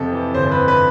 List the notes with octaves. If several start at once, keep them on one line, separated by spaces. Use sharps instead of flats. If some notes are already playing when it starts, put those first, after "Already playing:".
Already playing: F2 C3 A4
E3
G1 C5
C5
B4
F2
B4